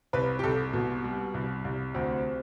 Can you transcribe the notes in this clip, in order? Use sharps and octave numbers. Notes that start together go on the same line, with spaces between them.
C2 B4
G4
C2 A4
B2
G3
C2
C2
D2 C4